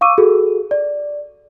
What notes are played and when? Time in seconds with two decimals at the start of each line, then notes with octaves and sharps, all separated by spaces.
0.01 F5 C#6 D6 E6 D#7
0.18 F#4 G#4 A4
0.71 D5